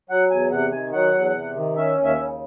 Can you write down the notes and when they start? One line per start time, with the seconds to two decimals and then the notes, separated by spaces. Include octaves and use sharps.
0.10 F#3 F#5
0.31 E2 G#5
0.51 C3 F#5
0.72 D#3 G#5
0.93 F#3 F#5
1.14 E2
1.35 C3
1.55 D#3
1.76 C#4 E5
1.98 D#2
2.04 E5
2.18 C#3